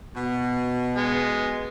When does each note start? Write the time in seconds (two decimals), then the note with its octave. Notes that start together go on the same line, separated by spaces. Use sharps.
0.15 B2
0.96 G#3 B3